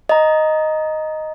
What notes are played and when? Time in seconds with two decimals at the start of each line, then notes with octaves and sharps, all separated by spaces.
0.09 D#5 A#5